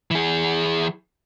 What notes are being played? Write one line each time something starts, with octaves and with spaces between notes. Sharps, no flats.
E3 G#4